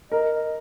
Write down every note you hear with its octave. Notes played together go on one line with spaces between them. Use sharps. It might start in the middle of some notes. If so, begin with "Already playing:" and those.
A#4 D#5
D#5